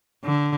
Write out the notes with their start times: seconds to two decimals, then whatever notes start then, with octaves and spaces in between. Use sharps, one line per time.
0.25 D3